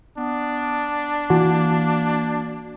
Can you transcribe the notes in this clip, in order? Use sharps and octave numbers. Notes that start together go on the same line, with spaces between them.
B3 D4
E3 A#3 F#4